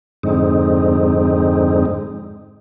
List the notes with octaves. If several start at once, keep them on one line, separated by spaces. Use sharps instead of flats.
F2 G#2 D3 G#3 C4 D#4